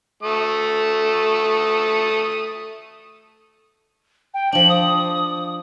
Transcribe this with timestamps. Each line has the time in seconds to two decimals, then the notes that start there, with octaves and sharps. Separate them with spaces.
0.23 A3 D#6
4.34 G5
4.52 F3 D4 F#7
4.69 D#6